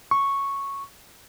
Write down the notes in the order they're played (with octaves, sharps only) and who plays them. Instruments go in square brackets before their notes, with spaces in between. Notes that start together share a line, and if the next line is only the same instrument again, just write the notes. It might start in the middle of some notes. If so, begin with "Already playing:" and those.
[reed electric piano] C#6